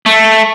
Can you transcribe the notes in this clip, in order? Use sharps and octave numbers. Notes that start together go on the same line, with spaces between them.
A3